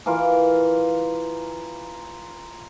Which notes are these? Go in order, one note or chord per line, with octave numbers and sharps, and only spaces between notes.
E3 F4 A#4 D6